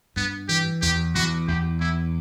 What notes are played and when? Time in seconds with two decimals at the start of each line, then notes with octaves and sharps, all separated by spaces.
0.16 G2 B3
0.49 E3 G4
0.82 E2 G4
1.15 E2 F#4
1.48 E2 G4
1.80 E2 E4